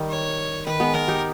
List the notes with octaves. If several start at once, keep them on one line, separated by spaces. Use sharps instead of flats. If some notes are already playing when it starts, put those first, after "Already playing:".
Already playing: D#3 G3
C#5
D#3 B4
G#3 B3
G#3 B3 A#4
D#4 G4